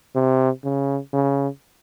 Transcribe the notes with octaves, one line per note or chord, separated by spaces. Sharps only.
C3
C#3
C#3